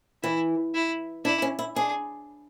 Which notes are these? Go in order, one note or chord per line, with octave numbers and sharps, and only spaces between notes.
E3 E4
E4
D4 E4
C#4
E4
D4 G#4